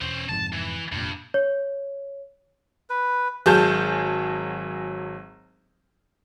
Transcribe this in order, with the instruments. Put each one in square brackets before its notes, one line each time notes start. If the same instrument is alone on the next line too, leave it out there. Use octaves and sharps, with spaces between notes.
[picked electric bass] E1 [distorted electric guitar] C#4 C5
[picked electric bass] F1 F2 G#2 [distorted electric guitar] A5
[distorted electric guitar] E3
[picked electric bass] F1 A#2 [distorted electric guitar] G2
[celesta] C#5
[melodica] B4
[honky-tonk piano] G#1 F#3 G#4 A5 G6